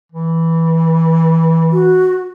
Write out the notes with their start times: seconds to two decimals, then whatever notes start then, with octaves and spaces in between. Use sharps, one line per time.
0.12 E3
1.72 F#4